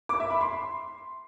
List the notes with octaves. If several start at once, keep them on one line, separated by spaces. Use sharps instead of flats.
D6
E5
B5
C6